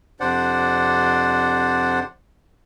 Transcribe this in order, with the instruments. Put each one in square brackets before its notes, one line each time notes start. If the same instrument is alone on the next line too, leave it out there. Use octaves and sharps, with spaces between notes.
[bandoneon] F2 C3 D4 C5 D5 F#5